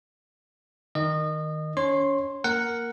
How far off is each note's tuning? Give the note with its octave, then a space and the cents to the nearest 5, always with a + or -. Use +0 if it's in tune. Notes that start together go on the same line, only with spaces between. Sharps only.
D#3 +0 D#5 -25
C#4 +35 C#5 -25 C6 +0
A#3 +0 A#4 +0 F#5 +0